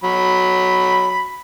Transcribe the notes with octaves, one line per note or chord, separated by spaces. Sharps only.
F#3 B5